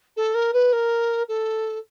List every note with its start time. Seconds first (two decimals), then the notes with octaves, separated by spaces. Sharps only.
0.16 A4
0.34 A#4
0.53 B4
0.72 A#4
1.28 A4